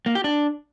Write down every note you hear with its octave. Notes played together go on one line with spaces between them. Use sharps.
A#3
G4
D4